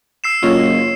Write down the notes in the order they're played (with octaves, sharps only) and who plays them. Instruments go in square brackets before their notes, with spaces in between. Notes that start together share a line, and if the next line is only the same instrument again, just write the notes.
[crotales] E6 C7 E7
[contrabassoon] F#1 [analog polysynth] F4 C#5 D#5